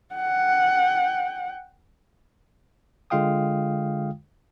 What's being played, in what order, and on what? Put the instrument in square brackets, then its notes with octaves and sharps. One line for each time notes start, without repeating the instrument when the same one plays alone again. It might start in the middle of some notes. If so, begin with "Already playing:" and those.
[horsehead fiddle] F#5 G5
[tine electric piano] D3 G#3 F4 F5 G5 D#6